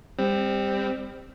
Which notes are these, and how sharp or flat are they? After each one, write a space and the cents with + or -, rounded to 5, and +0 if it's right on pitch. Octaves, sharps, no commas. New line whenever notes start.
G3 +30 C4 +0